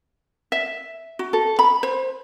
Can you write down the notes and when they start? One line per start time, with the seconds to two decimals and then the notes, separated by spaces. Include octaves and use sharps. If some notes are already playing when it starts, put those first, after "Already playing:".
0.52 E5
1.19 F#4
1.33 A4
1.59 B5
1.83 C5